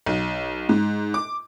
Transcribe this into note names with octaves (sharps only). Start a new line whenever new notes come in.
B1
G#2
D6